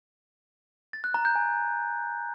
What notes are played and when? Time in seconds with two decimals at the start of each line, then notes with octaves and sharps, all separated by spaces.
0.93 A6
1.04 F#6
1.14 A#5
1.25 G6
1.36 G#5